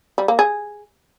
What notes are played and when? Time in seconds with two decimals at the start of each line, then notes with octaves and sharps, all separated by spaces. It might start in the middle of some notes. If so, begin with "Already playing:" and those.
0.18 G3
0.28 A#3
0.39 G#4